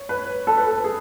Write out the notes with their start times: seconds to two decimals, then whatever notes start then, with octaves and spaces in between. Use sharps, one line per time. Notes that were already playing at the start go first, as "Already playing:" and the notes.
Already playing: C#5
0.09 B4
0.47 A4
0.57 B4
0.67 A4
0.84 G#4